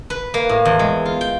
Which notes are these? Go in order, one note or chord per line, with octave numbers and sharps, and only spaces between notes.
B4
A#3
A2
E2
G#3
F4
G5